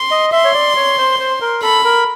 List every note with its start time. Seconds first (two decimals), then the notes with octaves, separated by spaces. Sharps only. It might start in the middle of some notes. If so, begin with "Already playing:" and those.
Already playing: C6
0.11 D#5
0.32 E5 C6
0.45 C#5
0.54 D5
0.77 C#5
0.98 C5
1.19 C5
1.41 A#4
1.62 A4 B5
1.85 A#4